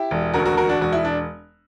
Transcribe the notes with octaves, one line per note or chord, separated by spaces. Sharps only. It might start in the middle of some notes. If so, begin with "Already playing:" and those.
Already playing: E4 G4
E1
D2 F#4 A#4
F#4 A#4
E1 F#4 A#4
D4 F#4
E1 F#4
E4
D4